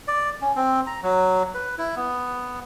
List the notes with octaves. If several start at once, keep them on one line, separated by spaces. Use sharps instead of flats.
D5
C#4
C4
A#5
F#3
B4
E4
B3